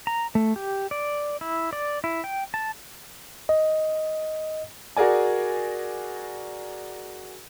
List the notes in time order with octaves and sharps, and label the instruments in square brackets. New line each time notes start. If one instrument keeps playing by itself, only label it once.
[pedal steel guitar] A#5
A3
G4
D5
E4
D5
E4
G5
A5
[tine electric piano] D#5
[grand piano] F#4 G#4 A#4 D5 G#5